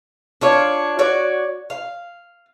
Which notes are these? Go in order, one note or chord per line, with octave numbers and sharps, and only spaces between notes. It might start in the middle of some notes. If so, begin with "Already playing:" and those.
D4 F4 C#5
F#4 C#5 D5
F5